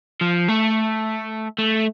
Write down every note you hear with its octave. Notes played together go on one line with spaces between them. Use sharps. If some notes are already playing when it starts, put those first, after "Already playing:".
F3
A3
A3